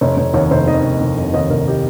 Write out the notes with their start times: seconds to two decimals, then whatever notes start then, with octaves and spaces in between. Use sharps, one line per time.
0.01 F1 C#5
0.17 F1 C#5
0.34 D#2 C#5
0.51 F1 C5
0.67 D#3 D#5
0.83 F1
1.00 F1
1.17 F1
1.34 D#2 D#5
1.50 F1 A#4
1.68 G4